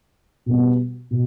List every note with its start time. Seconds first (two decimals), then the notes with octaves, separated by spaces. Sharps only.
0.46 B2 G3 B3
1.11 B2